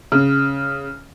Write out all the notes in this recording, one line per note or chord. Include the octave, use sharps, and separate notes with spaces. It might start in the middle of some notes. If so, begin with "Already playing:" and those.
C#3